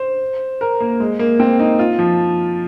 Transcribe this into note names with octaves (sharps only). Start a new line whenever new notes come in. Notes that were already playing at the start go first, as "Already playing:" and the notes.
Already playing: C5
A#4
A#3
G#3
A#3
C4
D#4
F4
F3